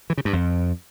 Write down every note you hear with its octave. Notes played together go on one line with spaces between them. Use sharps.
E3
C#3
G2
F2